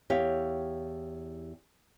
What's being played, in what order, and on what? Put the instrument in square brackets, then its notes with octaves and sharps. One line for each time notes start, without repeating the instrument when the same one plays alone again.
[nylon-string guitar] E2 G4 C#5 F5